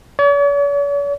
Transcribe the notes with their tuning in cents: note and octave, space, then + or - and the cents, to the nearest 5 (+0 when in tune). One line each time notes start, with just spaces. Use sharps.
C#5 +45